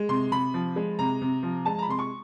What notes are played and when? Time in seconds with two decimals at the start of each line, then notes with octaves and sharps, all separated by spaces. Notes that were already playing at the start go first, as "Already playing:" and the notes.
Already playing: G#3
0.09 C3 C6
0.32 C3 B5
0.54 F3
0.76 G#3
0.99 C3 A#5
1.21 C3
1.43 F3
1.65 G#3 A5
1.79 A#5
1.83 B5
1.88 C3 C6
1.99 C#6